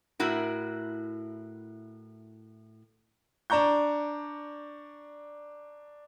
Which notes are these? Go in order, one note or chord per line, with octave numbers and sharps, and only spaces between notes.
A2 E4 F#4 A#4
D4 D5 A#5 C#6 G6